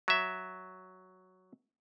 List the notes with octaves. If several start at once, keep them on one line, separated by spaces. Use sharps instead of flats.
F#3 E5